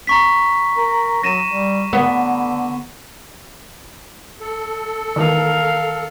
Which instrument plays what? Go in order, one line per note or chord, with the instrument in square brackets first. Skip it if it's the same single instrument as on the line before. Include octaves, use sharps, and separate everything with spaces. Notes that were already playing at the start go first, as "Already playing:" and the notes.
[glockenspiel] A#5 C#6 B6
[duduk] A#4
[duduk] F#3 [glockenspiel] A#6 D#7 E7
[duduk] G3
[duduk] D3 [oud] B3
[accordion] A4
[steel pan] D#3 E3 [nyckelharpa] A#4 F5